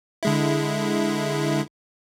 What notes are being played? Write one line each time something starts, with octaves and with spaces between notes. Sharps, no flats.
D3 G#3 E4